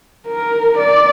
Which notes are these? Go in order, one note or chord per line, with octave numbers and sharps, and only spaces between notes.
A#4
D5